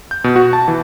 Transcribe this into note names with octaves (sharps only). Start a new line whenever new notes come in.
G6
B2
F#4
A5
E3